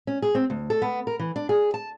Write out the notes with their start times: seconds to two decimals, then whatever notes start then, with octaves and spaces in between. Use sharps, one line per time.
0.07 C#4
0.22 G#4
0.35 C4
0.50 D2
0.70 A4
0.82 B3
1.07 A#4
1.19 E3
1.36 D4
1.49 G#4
1.74 A5